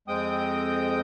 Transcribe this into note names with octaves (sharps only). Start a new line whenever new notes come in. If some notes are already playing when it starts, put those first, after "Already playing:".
F2 G#3 C4 G5 D#6 G6